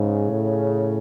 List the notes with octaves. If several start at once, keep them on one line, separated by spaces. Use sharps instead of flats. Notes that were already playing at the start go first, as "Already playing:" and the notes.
Already playing: G#2 C#3
A2